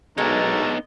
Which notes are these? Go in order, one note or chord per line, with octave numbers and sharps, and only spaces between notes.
B1 G#3 A3 B3 D4 D#4 A#4